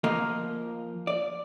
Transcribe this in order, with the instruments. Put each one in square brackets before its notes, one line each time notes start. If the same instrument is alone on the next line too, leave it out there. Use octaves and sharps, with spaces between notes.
[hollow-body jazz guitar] F3 A#3 A#4 D#5
D5